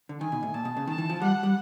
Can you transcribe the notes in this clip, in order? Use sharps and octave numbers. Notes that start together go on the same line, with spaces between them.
D3
D#3 G#5
B2
A2
A#2 A5
B2
C#3
D#3 A5
E3
F3
G3 F#5
G3